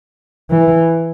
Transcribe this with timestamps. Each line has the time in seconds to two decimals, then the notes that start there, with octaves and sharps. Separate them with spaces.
0.50 E3